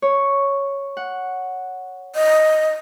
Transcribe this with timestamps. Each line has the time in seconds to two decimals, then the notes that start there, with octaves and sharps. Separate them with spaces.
0.02 C#5
0.97 F#5
2.15 D#5